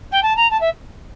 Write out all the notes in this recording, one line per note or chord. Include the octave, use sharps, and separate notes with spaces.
G5
A5
A#5
A5
E5